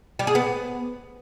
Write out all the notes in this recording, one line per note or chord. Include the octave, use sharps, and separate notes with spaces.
G3
G#4
B3